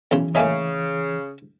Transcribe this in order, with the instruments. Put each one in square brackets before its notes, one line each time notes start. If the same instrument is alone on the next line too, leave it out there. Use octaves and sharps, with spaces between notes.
[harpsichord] B1 C#3 C6 [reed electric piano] E3
[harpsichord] A2 A#3 D#4 [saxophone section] C#3 [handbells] C#5 E5 G#5